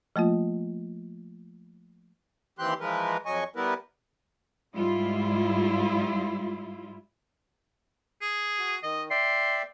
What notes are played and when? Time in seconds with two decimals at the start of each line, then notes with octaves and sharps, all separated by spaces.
0.16 F3 A3 A#3 F4
2.59 D#2 E3 C4 G4 C6 F#6
2.80 E3 F3 G#3 A#4 B4
3.26 F2 F#3 D#5 G#5 C#6
3.56 G3 B3 E4 A#4 B4
4.74 G#2 G3 E4 F4
8.21 G#4
8.59 F#4
8.83 D#3 D#5
9.10 D5 E5 G5 C6